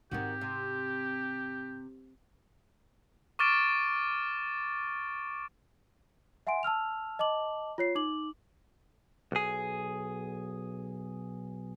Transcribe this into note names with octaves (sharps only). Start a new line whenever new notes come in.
G#2 D#3 C4 F#4 G4
C3
C#6 D6 F6 A6 D7
E5 F#5 G#5 C6 D7
A5 E6 F6 F7
D#5 A5 D6 F#7
F4 C#5 C7
D#4 D6 F#7
B1 G#4